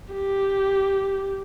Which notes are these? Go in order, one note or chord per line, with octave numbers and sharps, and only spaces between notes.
G4